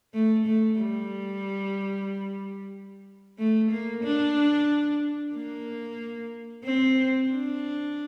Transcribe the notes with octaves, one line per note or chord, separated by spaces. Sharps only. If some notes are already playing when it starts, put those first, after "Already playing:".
A3
A3
G3
A3
A#3
D4
A#3
C4
D4